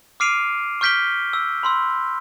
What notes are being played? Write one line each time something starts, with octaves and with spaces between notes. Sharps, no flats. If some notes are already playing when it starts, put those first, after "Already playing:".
D6 F6 C7 D7 D#7 F7
C#6 F6 G6 B6 D7 G7
E6
B5 C6 E6